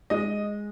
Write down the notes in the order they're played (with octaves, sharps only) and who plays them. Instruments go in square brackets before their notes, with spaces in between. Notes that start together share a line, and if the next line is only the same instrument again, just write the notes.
[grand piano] G#3 D#5